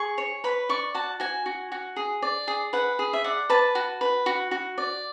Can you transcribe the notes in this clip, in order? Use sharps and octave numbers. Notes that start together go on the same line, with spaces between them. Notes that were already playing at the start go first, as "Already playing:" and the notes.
Already playing: G#4 C#6
C#5
B4 B5
D5 C#6
F#4 A5
F#4 G#5
F#4
F#4
G#4
D5
G#4
B4 F#5
G#4
E5
D5 F#5
B4 A5
F#4
B4
F#4
F#4
D5